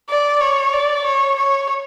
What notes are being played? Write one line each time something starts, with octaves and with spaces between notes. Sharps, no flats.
D5
C#5
D5
C#5
C#5